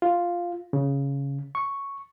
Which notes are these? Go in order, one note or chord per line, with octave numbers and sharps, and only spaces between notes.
F4
C#3
C#6